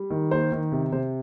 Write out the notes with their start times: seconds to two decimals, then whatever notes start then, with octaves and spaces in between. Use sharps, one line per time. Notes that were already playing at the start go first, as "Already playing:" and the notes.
Already playing: G3
0.10 D#3
0.31 A#3 C5
0.52 D#3
0.72 C3
0.92 C3 C5